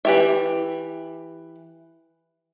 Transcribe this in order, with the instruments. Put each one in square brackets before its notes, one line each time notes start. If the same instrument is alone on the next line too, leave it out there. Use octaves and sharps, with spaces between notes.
[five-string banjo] E3 G4 E5